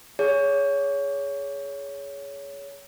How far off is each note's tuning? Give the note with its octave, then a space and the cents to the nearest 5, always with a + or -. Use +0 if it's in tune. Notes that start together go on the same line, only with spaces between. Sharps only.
G#4 +0 C#5 +20